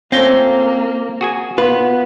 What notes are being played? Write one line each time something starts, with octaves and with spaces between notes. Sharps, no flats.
A3 A#3 C4 C#4 F4 C5 A#6 G7
F#4 G#4 G#5
B3 F4 B4